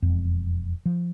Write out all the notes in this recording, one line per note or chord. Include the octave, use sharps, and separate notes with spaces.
E1 F2
F3